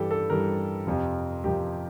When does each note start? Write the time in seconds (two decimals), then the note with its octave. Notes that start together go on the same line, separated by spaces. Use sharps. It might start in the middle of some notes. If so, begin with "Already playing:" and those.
Already playing: G2 E3 G3 G4 A4
0.11 A4
0.30 G2 E3 G3 A#4
0.87 F2 C3 F3
1.44 F2 C3 F3 G4